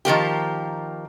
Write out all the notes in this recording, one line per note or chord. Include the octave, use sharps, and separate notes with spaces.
D#3 F3 A#3 G4